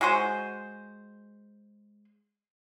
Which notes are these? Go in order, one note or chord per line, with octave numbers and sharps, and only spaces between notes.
G#3 F#4 G#4 C5